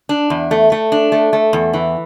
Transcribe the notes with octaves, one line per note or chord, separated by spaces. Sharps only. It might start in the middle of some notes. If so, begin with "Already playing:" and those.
D4
E2
A3
A3
D4
A3
A3
E2
E3